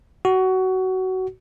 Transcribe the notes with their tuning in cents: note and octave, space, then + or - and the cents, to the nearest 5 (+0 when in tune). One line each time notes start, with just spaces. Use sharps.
F#4 +20